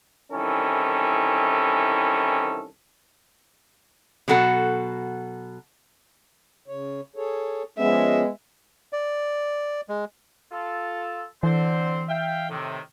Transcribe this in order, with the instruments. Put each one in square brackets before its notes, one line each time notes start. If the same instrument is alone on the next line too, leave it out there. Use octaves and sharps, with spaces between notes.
[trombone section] C2 D#3 E3 C#4 A4
[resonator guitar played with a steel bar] B2 F#3 F#4 A4 F#5
[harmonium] C#3 C#5
G#4 A4 C#5
[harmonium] F3 C#4 [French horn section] G#3 B3 [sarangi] E5
[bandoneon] D5
G#3
[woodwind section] F4 A4
[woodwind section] D3 C4 C5 [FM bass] E3
[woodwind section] E5 F5 G5
A2 C3 D#3